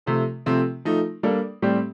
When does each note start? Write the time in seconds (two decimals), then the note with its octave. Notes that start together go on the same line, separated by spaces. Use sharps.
0.06 C3 F3 A3
0.46 C3 F3 A3 C4
0.85 F3 A3 D#4
1.23 G3 A#3 D4 A4
1.62 A2 G3 C4 G4